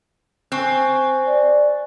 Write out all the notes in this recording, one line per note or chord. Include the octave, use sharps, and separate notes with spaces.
C4 G#5 C#6 F#6
D5